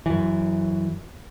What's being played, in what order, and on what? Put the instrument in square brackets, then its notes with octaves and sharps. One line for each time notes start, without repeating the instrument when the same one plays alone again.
[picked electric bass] F#2 E3